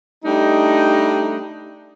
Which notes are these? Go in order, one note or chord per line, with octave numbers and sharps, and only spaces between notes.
G3 A3 D4 D#4